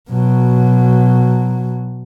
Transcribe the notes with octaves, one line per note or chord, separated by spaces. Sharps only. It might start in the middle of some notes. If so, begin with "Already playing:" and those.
B2 F#3